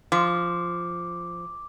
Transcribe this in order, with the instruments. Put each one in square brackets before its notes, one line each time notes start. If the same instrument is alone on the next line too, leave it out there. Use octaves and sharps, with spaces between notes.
[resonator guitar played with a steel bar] F3 [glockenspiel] D6